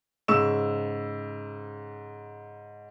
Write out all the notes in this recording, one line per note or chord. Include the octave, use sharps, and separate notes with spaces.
G#2 C#3 C#6 E6 E7